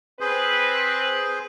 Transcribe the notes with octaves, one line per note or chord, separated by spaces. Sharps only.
C4 G#4 B4 C5